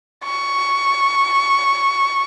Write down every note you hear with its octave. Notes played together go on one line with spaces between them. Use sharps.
C#6